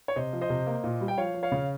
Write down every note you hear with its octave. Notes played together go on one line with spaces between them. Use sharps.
C#5
C3 C5 D#5
F3
C5 D#5
C3
A#3
A#2
G3
G5
F3 C#5 F5
F3
C#5 F5
C#3